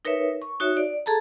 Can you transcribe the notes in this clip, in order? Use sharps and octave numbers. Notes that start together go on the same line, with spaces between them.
D#4 A#4 B4 C#5 E5
C#6
D#4 F#4 C#5 E5
D5
G#4 A4 A5 A#5